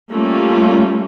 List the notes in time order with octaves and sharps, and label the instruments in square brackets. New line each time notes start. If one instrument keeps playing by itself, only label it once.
[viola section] G3 A3 A#3 C#4 F4